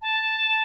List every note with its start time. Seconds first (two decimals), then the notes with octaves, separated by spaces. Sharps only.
0.01 A5